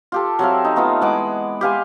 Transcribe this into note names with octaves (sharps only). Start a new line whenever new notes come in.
F4 G4 A4
F#3 C4 E5 F5
D#4
A3 B3 D#4 F4
E3 G#3 F#5 D6
G4 F5 G#5 C6